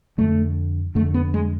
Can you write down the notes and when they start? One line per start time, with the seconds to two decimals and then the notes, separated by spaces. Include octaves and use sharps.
0.18 F2 D3 A3
0.95 F2 D3 A3
1.14 B3
1.34 G#3